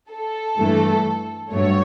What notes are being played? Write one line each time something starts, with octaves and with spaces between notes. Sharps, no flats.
A4
G2 E3 A3
G2 F#3 A3 C#5